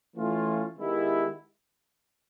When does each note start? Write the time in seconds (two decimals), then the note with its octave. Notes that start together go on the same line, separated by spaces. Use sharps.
0.15 E3 A3 C#4 F4
0.77 D#3 G#3 B3 E4 G4